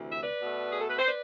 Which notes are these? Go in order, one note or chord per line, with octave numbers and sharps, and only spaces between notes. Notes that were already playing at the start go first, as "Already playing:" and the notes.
Already playing: D2 C3 E3
E5
B4 D5
B2 A3
G#4
A4
B4
C5
B4 D5